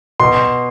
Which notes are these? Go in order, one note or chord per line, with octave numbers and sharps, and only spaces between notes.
B2 C6